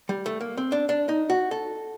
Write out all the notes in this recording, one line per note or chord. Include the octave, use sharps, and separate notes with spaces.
G3
A3
A#3
C4
D4
D4
D#4
F#4
A4